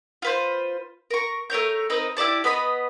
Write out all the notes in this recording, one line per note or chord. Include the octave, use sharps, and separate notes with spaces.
F4 B4 C5
A#4 C#6
A3 A#4 C#5 G6
C4 D#4 A#4 B4
E4 G4 D5 A5
B3 B4 D#5 B5